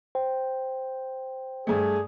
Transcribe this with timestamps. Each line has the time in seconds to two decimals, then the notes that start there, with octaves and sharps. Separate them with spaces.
0.15 C5 G5
1.67 G2 A3 G#4